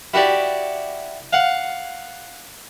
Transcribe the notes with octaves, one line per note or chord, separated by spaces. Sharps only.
E4 F#4 G4 D5
F5 F#5